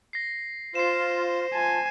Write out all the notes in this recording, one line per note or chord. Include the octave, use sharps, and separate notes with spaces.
A#6 C7
F4 C5 C7 E7
F4 G#5 A5